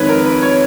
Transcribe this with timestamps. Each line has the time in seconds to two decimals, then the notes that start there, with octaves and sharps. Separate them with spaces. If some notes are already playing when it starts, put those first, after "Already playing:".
Already playing: F2 D#3 G#3 D#4 B4 C#5
0.08 A#4
0.25 B4
0.42 C#5